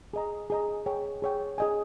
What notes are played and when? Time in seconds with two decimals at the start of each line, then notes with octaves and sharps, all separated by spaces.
0.13 G#4 D#5 A#5
0.50 G#4 D#5 A#5
0.86 G#4 C#5 G5
1.22 G#4 C#5 G5
1.58 G#4 D#5 G#5